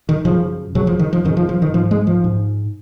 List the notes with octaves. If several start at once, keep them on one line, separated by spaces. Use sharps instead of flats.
D#3
F#2 C#3 F3
F#2 C#3 F#3
F3
D#3
F3
F#2 C#3 D#3
F3
F3
D#3
G#2 F3
G#3
F3
G#2